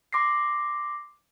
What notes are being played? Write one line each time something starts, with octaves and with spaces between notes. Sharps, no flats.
C6 D6 A#6 C7